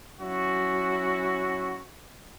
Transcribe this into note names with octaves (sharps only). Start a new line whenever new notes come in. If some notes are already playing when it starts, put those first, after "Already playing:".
F#3 C#4 E4 F#4